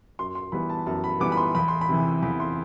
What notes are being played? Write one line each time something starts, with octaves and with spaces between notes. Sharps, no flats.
F#2 C6
C6
E3 G3 B3 B5
A5
F#2 A5
B5
E3 G3 B3 D6
B5
C6
E2 B5
C6
B5
C3 E3
E2 B5
C6